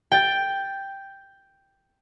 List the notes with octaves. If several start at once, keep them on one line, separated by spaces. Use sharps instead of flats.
G5 A6